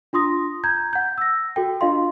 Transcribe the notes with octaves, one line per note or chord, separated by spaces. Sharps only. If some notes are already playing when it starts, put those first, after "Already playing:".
D4 F4 C6 D#6 A#6
A#5 G6 G#6
F#5 G6
E6 A#6
F#4 A4 G5
D4 F4 D#5 F5 C6